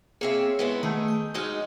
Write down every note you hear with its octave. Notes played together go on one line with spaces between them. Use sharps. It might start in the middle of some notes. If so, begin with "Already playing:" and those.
A#3 C4 G#4 C#5 E5
G#3 B3 E4
D#3 A3 G#4
G6
F#3 G#3 D#4 D#6 F6